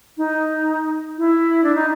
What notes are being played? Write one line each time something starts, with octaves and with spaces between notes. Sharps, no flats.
D#4
E4
D4
D#4